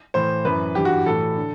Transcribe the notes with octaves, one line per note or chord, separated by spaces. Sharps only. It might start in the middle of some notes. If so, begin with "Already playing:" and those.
A2 E3 C5
F#2 E3 B4
G2 E3 G4
F#4
A2 E3 A4
D3